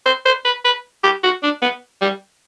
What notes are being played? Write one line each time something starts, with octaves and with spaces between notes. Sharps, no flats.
C5
C5
B4
B4
G4
F#4
D4
B3
G3